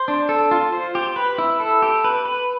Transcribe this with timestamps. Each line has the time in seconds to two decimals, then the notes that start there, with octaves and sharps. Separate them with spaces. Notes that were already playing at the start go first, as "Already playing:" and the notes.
Already playing: C5
0.08 D4
0.29 A4
0.51 F4
0.72 C5
0.95 G4
1.16 B4
1.38 E4
1.60 A4
1.82 G4
2.04 B4
2.25 B4